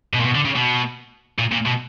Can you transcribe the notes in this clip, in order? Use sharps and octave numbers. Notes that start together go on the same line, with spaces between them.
B2
A#2
B2
D3
C#3
B2
A#2
A#2
B2